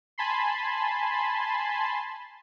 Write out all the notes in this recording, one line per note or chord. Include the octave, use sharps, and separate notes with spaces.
G#5 A5 B5 C6